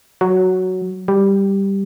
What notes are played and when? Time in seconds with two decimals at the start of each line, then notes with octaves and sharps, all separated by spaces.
0.21 F#3
1.08 G3